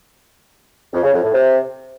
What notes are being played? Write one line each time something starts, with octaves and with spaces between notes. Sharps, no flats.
F2
C#3
F2
A2
C3